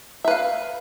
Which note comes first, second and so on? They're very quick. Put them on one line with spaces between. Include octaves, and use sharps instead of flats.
E5 B4 F5